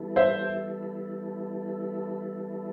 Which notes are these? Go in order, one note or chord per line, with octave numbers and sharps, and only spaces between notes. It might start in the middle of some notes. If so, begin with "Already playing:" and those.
Already playing: E3 G3 B3 E4 A4
C5 E5